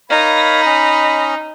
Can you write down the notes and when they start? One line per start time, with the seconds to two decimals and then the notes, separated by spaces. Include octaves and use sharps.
0.10 D#4 A#4 C#5 F5 B5
0.66 C#4 D#5